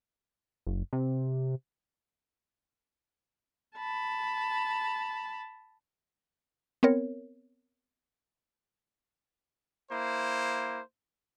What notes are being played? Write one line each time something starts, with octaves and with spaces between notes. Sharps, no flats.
F#1
C3
A5 B5
B3 C4 A#4 C#5
A#3 E4 C5